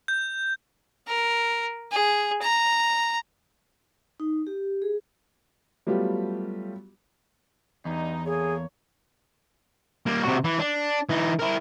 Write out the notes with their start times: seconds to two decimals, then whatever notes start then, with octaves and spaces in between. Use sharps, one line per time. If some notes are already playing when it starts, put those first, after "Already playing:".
0.08 G6
1.07 A#4
1.92 G#4
2.42 A#5
4.20 D#4
4.47 G4
4.82 G#4
5.87 F#3 G3 A3 B3 F4 G4
7.85 E2 G2 D#4
8.26 A#3 G#4 A4 C#5
10.06 G3 A#3
10.23 C3 F#4
10.44 E3
10.59 D4
11.09 E3 D#4
11.39 E4 A#4